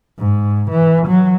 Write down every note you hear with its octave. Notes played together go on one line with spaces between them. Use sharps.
G#2
E3
F#3